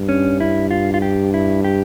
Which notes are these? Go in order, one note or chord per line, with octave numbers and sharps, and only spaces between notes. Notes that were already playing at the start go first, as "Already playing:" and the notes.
Already playing: G2
C#4
E4
F4
F4
G4
E4
G4